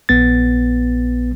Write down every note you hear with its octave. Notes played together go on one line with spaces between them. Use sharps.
A#1 B3 A6